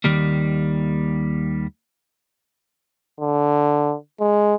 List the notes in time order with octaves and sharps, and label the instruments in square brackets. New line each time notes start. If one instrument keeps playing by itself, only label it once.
[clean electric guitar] D#2 D#3 G3 A#3
[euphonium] D3
G#3